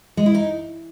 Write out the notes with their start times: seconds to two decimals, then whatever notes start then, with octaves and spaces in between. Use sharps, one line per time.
0.17 G#3
0.26 E4
0.35 D#4